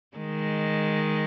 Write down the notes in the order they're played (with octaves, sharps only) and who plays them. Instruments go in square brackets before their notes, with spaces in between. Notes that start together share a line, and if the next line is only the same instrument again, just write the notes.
[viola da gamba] D#3 G#3